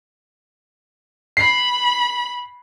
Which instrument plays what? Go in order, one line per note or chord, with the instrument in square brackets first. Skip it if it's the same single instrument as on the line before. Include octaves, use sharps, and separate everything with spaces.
[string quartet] B5 [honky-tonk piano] C7